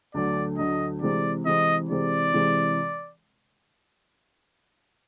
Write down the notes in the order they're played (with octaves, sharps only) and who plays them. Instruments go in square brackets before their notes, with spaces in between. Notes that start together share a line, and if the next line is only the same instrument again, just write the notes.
[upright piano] D2 D3 F#3 A3 [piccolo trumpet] D5
[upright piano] D2 D3 F#3 A3 [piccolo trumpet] D#5
[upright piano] C3 E3 G#3 C4 [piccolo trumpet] D5
[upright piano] C3 E3 G#3 C4 [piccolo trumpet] D#5
[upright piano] C3 E3 G#3 C4 [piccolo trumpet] D5
[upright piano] C3 E3 G#3 C4